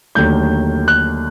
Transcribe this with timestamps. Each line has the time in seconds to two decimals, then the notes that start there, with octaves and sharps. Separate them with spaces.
0.15 D#2 D3 F#3 A3 G6
0.88 F#6